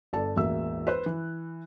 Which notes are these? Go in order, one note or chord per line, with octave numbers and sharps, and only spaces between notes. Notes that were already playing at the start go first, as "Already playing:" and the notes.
G1 A4 D5 A5
E1 A1 A#3 F#4 E5 E6
B4 C5 F#6
E3